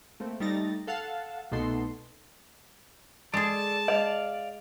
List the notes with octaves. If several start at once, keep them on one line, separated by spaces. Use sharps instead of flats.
A3 A#3 C4
G3 A3 D#4 A6 A#6
A4 F5 F#5 A5
C2 B2 A3 D#4 A4 C6
G#3 G#4 A4 D5 A5
D5 D#5 F5